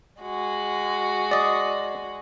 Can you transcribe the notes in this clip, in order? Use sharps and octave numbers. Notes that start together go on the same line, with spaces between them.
G#3 F#4
D5 D#5